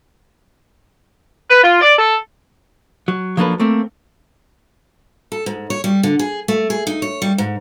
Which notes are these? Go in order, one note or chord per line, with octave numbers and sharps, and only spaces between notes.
B4
F4
D5
A4
F#3
F3 F#3 A#3 D4 A4 B4
A3 A#3 C4
A4
G#2
C#5
G3
D3
G#4
A3
G#4
D#4
C#5
G3
G#2